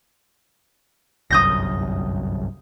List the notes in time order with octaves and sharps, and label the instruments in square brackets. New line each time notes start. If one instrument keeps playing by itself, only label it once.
[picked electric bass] G1 C2 F#2 [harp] D#6 G6 A#6